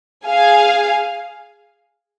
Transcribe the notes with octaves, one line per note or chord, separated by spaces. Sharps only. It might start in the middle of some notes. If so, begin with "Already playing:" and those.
G#4 F5 G#5